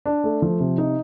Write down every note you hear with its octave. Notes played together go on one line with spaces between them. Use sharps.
D4
A3
F3
C3
D#4